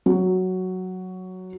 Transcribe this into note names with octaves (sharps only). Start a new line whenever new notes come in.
F#3